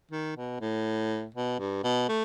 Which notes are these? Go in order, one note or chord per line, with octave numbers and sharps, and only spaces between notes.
D#3
B2
A2
B2
G2
B2
A3